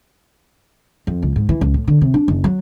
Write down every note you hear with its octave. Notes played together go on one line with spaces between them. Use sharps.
F2
C#2
G#2
E3
C#2
A2
D3
C3
D4
F#1
F#3